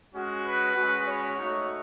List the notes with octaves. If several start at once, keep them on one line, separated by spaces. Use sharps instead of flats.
G#3 C#4 F#4
B4
G#3 C#4 F#4
C#5
A3 D#4 F#4